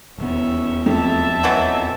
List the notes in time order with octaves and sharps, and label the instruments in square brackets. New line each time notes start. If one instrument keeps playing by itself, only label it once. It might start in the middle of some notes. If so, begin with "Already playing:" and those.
[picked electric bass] D#1 E2 B3 [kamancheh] C#4 E5
[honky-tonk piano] F2 [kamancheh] E5 A5
[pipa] D#3 E3 F#3